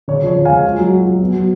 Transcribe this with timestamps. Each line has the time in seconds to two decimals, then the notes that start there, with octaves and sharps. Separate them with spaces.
0.08 C#3 C#5
0.23 F3 C#5
0.36 C#3
0.45 F5 G#5
0.51 G#3
0.65 F4
0.78 F#3
0.92 F4
1.06 F#3
1.21 B3
1.34 F#3